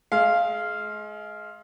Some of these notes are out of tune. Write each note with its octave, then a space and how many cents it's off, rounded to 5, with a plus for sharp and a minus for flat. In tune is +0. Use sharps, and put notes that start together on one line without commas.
G#3 +30 F5 -10